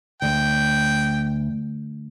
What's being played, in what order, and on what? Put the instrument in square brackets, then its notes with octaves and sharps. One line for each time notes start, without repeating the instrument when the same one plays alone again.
[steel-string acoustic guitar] D2 [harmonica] G5